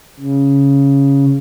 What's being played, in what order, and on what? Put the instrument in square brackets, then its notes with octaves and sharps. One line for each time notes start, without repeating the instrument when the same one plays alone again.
[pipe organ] C#3